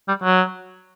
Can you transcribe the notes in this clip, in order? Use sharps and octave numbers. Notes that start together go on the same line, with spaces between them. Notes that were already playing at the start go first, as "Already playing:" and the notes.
G3
F#3